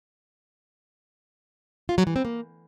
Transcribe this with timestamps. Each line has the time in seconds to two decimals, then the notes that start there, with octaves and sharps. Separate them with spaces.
1.89 F4
1.98 F#3
2.07 E3
2.16 C4
2.25 A#3